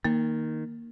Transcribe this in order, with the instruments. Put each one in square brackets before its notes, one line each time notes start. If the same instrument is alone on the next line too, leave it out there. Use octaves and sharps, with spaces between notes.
[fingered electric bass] D#3 [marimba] A#3